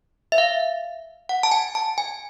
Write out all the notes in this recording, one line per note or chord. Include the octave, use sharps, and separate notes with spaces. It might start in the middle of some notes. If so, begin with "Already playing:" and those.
E5
F5
F#5
A5
G#5
A5
G#5